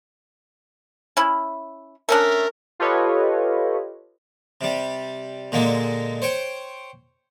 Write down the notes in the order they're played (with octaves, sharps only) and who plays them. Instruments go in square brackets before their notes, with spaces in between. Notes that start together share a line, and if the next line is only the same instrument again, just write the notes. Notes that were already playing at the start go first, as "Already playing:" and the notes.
[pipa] C#4 E4
[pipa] A3 C#4 D4 [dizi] A#4
[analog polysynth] F4 G4 A4 B4 C#5 D#5
[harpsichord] C3 G3
A#2 D3 G#3 A#3
C5 C#5 G5